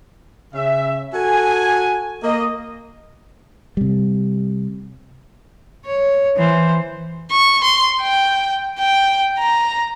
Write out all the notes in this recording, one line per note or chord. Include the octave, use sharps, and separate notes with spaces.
C#3 E5
F#4 A4 G#5
A#3 D#5
C3 G3
C#5
E3 C5
C#6
C6
G5
G5
A#5